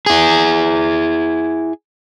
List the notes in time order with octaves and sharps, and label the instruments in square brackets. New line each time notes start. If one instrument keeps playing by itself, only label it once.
[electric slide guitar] E4 G#4